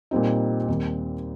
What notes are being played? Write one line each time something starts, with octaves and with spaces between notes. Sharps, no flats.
A#2 G3 C4 D#4
D#2 D#3 G3 C4